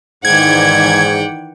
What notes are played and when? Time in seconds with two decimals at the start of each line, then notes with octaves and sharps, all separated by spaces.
0.25 G#2 D#3 E3 D5 F#5 G5 G#6